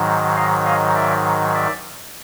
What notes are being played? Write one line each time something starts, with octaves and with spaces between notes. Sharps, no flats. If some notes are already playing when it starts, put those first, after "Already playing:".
Already playing: G#2 D#3 F#3
D#5 F5
D#5 F5
D5 E5
D5 E5